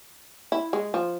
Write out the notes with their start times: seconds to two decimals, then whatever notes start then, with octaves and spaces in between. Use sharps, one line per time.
0.52 E4
0.73 G#3
0.94 F3